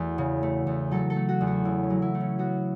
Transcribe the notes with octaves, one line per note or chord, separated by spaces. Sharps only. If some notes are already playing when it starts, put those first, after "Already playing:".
Already playing: E2 A3 F#4
C#3
A3
E2
F#3 A4
A4
A3
F#4
E2
F#4
C#3 E4
C#4
F#3
E4
A3
C#4
B3 F#4